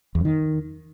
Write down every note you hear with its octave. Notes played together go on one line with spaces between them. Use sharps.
E2
F#2
D#3